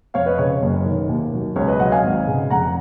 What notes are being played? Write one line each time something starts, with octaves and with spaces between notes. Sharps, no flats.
F1 C#5 F5
B4 D#5
C#3 C#5
C#5
F#1
D#3
D#2
F#3
C#2 C#5
B4 D#5
F#3 D#5 F#5
F5 G#5
G#1
C#3
F1 F#5 A#5